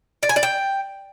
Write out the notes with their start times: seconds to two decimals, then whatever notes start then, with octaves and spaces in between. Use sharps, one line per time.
0.23 D5
0.29 G#5
0.36 D5
0.43 G5